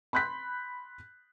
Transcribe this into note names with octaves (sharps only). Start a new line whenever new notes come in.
B5 C6 F#6 G6 B6